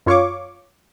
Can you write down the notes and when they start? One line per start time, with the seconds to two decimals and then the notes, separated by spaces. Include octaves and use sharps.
0.06 F#2 F4 C#5 F5 C#6 D6